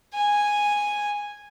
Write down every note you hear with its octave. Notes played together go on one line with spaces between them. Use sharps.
G#5